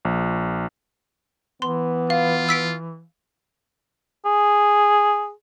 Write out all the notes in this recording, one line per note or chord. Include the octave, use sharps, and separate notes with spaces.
A#1
E3 B3 C6
F4 F5
E6 B6 D7
G#4